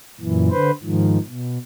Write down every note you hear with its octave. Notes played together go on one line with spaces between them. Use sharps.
F#2 A#2 E3
D3 B4 C5
G#2 D#3 F3
B2